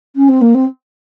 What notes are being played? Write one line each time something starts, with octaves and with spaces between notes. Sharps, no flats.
C#4
C4
A#3
C4